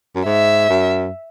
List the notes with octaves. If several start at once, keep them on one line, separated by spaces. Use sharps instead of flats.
F#2
G#2 E5
F#2